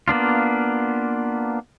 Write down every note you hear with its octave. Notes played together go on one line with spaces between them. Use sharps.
A#3 B3 D4 F4